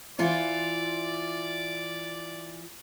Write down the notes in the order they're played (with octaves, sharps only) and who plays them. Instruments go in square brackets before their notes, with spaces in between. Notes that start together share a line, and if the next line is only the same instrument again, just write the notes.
[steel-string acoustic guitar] E3 F4 C5 [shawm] D5